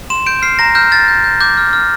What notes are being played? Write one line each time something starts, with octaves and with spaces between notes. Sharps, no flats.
C6 E7
G6 D7
F6 C7
A#5 A#6
F6 G6
F6 A6
G6
G6
D6 G6
F6
F6